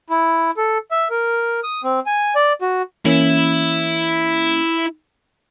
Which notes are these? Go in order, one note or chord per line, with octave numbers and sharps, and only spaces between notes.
E4
A4
E5
A#4
D#6
C4
G#5
D5
F#4
E3 A#3 C#4 E4